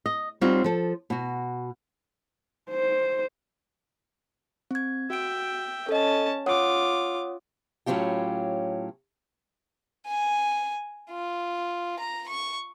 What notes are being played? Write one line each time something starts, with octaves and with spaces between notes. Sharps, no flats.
D#5
G3 C4 D#4 F4 F#4 C#5
F3 A4
B2 F#4
C5
C4 G#6
F#4 E5 G5 D7
C#4 A4 D#5 A5
F4 C#5 F#5 D6 D#6
A2 F#3 C#4 F4 G4
G#5
F4
A#5
C#6